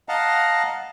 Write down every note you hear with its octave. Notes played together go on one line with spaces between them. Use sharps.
D#5 F5 F#5 A5 A#5